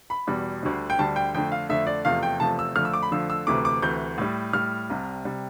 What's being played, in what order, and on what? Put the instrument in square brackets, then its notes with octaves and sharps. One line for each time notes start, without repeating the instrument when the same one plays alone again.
[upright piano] B5
E2 B2 G3
D2 D3 G3
G5
D2 D3 G3 A5
G5
F2 D3 A3 G5
F5
F2 D3 A3 E5
D5
E2 C3 F3 A3 F5
G5
E2 C3 F3 A3 A5
E6
F2 D3 F3 A3 F6
E6
D6
B5
F2 D3 F3 A3 E6
E6
D2 C3 E3 A3 D6
D6
D2 C3 E3 A3 G6
A2 G3
A2 G3 F6
C2 C3 G3
C3 G3